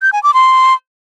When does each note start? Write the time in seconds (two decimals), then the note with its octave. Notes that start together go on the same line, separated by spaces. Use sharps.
0.02 G6
0.13 G#5
0.23 D6
0.34 C6